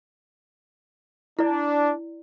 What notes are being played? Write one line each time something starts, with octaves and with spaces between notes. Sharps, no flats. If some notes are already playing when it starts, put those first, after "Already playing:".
D4 E4 D5